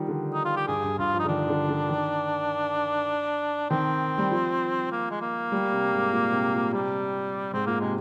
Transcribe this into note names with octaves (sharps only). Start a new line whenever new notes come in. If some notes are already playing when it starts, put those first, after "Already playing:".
Already playing: D#3 F3 G3
D3
D#4
F4
G4
G2 G#4
G2
G2 F4
F3
D3 D#4
D#3 D4
D3
D3
D#3
D#3 C4
G3
F3
A#3
G#3
A#3
G3
C3
G#2
A#2
C3
A#2
C3 G3
G#2 C4
A#2 A#3
C3 G#3